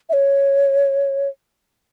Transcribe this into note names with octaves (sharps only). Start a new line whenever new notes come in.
E5
C#5